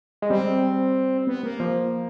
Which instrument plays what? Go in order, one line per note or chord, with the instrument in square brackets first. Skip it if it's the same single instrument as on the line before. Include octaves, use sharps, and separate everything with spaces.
[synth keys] G#3
[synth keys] G3 [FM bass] C4
[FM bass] B3
A#3
[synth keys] F3